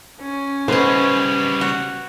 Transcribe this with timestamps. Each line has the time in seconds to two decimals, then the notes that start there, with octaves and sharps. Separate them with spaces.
0.21 C#4
0.68 C#3 G3 B3 B4 C5 D#5
1.61 F#4